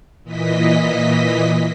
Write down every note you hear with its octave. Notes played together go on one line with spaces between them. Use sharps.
A#2 E3 D#5 B6